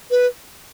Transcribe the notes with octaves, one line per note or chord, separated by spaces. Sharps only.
B4